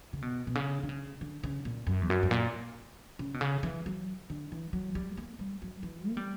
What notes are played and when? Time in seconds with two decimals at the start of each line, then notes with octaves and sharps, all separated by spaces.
0.13 C#3
0.22 B2
0.47 B2
0.55 C#3
0.83 D3
0.89 C#3
1.21 D3
1.44 C#3
1.65 A#2
1.87 F#2
2.02 E2
2.10 F#2
2.23 G2
2.31 A#2
3.19 C#3
3.34 B2
3.41 C#3
3.63 E3
3.86 F#3
4.30 D3
4.52 E3
4.73 F#3
4.95 G3
5.18 A#3
5.39 G3
5.62 F#3
5.83 E3
6.08 A#3
6.17 G3